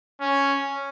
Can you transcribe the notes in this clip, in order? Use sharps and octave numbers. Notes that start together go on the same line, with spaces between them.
C#4